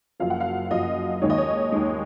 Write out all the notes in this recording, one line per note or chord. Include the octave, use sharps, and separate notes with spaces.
F#1 F#2 F3 F5
F#5
F5
F#1 F#2 F3 D#5
D#2 D#3 G#3 C#5
D#5
C#5
D#2 D#3 G#3